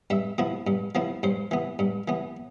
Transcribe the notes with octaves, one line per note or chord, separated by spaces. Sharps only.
G2 E5
F3 B3 E4
G2
F3 B3 E4
G2 C5
E3 B3
G2
E3 B3